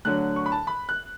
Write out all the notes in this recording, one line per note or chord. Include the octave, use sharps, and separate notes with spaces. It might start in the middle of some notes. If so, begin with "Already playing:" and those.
D2 D3 F#3 F#6
C#6
B5
A5
B5
F#6